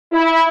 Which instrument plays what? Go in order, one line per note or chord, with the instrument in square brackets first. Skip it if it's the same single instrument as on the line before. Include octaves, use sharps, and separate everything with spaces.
[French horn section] E4